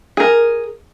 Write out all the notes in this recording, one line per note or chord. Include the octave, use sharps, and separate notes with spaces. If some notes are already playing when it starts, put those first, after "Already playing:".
G#4 A#4